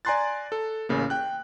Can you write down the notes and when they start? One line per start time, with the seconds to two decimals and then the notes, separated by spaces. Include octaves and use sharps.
0.05 D5 G#5 A#5 C6 F#6 A6
0.52 A4
0.89 A1 C#3 A#3
1.10 G5 F#6